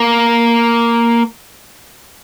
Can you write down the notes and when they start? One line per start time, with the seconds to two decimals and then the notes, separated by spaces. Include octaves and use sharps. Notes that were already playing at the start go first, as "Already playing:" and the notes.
Already playing: A#3